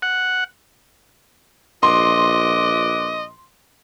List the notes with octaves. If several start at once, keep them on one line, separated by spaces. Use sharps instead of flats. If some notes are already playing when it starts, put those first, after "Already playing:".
F#5
A#1 F4 B4 D#5 C6 D6